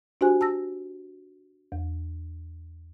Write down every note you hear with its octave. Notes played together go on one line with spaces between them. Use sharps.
D4 F#4 G4 C5 G#5 F#6
A5 E6 A#6
E2